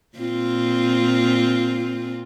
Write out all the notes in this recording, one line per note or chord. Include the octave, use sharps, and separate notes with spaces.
A#2 C4 F4